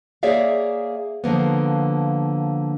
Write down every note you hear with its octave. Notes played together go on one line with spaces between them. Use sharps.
A#3 G#4 C#5 D5 E5 F5
D3 F3 A#3 B3